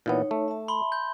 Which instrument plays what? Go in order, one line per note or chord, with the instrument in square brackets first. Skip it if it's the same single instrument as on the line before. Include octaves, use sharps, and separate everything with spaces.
[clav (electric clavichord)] A#2 E3 B3 [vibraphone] D#4 C#5
[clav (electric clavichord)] A3
[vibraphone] E5 A5
[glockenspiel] B5 C6 G7
G6